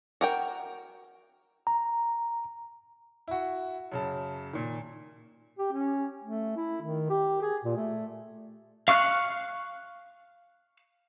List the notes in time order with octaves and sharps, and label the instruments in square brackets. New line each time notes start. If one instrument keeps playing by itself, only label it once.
[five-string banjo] F#4 A#4 G5
[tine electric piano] A#5
[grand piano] E4 F#4
F#2 C#3 A5
A#2 D#3
[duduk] G4
C#4
A3
E4
D#3
G4
G#4
A#2
A3
[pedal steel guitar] F5 C#6 F6 F#6